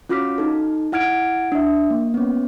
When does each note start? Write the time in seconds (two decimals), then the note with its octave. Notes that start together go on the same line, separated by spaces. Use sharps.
0.09 C#4 F4 F#4 D6 F6 B6
0.38 D#4 A4
0.92 E4 F#5 F6 G#6 D7
1.52 D4 E5
1.90 A#3
2.14 B3 C#4